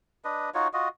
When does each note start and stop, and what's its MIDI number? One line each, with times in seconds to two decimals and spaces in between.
0.25 0.50 62
0.25 0.50 71
0.25 0.50 75
0.54 0.68 63
0.54 0.68 65
0.54 0.68 66
0.54 0.68 73
0.73 0.88 65
0.73 0.88 66
0.73 0.88 75